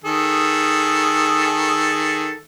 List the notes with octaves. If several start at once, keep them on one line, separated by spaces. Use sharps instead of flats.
D#3 G#4 A4